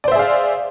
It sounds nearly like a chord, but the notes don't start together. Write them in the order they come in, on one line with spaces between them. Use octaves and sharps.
D5 C5 E5 G#4 F5